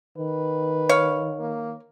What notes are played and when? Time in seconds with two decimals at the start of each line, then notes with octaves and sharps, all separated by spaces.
0.18 D#3 B4
0.89 C#5 F5
1.40 A#3